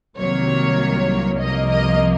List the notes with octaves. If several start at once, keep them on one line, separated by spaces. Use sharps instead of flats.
C2 C3 D#3 F#3 A#3 C#5
C2 C3 F3 A#3 D#5
D#5